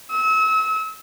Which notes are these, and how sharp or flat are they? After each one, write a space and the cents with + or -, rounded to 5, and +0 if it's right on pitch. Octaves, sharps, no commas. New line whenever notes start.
E6 -35